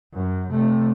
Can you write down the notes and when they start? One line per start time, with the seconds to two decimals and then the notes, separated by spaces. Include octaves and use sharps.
0.13 F#2
0.50 C3 A3